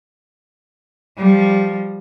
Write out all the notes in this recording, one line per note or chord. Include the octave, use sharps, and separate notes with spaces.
F3 G3